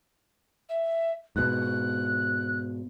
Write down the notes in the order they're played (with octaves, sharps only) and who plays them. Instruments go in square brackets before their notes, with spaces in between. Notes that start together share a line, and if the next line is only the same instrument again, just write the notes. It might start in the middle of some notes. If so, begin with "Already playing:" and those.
[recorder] E5
[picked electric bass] G#2 B2 [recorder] F#6